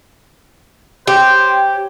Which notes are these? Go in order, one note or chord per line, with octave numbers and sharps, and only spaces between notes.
G4 C5 C#5 G5